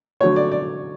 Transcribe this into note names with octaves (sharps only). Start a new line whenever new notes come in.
D3 F#3 A3 C#5
D5
D5